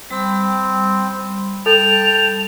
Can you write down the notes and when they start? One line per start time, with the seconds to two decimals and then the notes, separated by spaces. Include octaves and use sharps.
0.11 G3 C4 B5
1.66 A4 G5 A5 F7